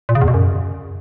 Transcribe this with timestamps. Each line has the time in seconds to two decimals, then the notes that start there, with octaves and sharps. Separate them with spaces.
0.09 A#2
0.15 C#3
0.21 E2
0.28 B2
0.34 F#2